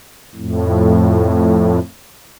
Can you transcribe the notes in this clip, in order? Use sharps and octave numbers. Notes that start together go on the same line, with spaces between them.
F2 A2